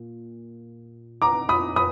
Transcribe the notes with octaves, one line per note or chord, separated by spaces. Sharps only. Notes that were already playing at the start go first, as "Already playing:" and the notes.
Already playing: A#2
A#5 D6
B5 D#6
B5 D#6